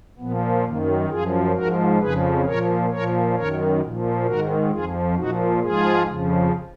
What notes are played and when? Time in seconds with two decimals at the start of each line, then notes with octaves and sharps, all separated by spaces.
0.19 A#2 F3 B3
0.64 F#2 D#3 A#3
1.09 F#2 F3 F4 G#4
1.54 G#2 F3 F#4 A#4
2.00 F2 C#3 F3 G#4 B4
2.45 A#2 F3 A#4 C#5
2.90 A#2 F3 A#4 C#5
3.35 F#2 D#3 A#4 C#5
3.81 A#2 F3
4.26 G#2 D#3 F#4 A#4
4.71 F2 F3 F4 G#4
5.16 A#2 F3 D#4 F#4
5.62 G#2 F3 F4 G#4
6.07 F2 C#3 F3